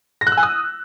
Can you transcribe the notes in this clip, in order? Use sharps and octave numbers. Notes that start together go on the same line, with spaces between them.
A#6
F#6
E6
G#5
D#6